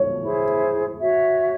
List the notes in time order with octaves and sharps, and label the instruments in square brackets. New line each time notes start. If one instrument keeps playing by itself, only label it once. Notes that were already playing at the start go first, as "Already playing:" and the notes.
Already playing: [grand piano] C#5
[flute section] E4 G#4 C5
F#4 C#5 E5